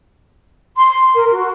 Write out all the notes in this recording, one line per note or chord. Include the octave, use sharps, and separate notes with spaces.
C6
A#4
F#4